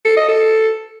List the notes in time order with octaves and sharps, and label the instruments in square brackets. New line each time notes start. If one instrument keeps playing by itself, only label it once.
[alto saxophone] A4
D#5
A4